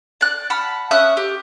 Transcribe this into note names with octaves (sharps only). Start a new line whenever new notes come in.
D5 F#6
F#5 A5 B5 F6
C#4 E5 D#6 F#6
G4